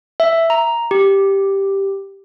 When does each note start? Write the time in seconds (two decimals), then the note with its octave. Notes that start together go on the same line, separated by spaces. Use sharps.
0.20 E5
0.50 A#5
0.91 G4